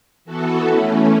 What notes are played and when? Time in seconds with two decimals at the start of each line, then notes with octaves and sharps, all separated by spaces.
0.25 E3 B3 F#4 A4
0.66 E3 A3 C#4